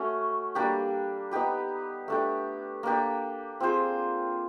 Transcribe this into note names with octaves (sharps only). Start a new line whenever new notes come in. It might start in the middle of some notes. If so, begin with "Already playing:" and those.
Already playing: A3 C#4 F#4
G3 A#3 D4 G4
B3 D#4 G4 B4
A3 D4 G4
A#3 D4 G4
C4 F4 G#4 C5